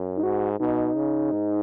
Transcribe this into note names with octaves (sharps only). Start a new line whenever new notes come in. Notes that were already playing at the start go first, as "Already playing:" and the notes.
Already playing: F#2
D#4
G#2 F#4
B2 D#4
C#3
G#2